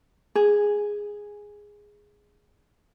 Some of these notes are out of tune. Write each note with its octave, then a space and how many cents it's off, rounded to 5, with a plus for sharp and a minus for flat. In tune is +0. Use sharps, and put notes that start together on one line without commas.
G#4 -5